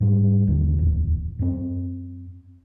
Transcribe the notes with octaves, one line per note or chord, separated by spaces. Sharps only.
G#2 G3
A1 D#2 D3
D1 E2
F#2 C4